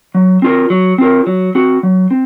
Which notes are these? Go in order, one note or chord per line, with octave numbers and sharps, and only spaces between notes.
F#3
C4 F4 A#4
F#3
C4 F4 A#4
F#3
C4 F#4
F#3
C4